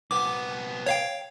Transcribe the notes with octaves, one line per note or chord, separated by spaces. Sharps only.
C2 B3 D6
C#5 F5 G5